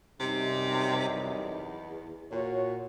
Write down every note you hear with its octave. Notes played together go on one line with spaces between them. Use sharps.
F#2 C3 G3 D#4
E2
A#2 F#4 C#5